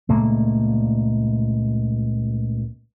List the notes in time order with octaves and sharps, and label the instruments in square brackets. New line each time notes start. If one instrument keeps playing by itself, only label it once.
[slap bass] C#2 A#2 A3 A#3